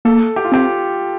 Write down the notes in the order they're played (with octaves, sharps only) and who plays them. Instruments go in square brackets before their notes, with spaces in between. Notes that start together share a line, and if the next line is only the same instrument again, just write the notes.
[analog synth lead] A#3 [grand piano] A4
[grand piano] G4
F4
[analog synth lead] C4 [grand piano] G4